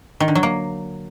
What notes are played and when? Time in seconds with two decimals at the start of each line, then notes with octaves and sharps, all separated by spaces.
0.20 D#3
0.28 D3
0.35 F#3
0.43 A#3